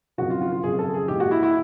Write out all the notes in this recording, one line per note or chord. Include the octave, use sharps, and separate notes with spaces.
G#1 F#2 C#3 F3 F#4
F4
F4
F4
G#1 F#2 C#3 F3 G#4
A4
G#4
A#1 G#2 E3 G4
F#4
E4
E4